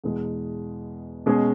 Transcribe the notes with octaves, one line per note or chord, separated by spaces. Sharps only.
E2 B2 G#3
B2 G#3 C#4 G#4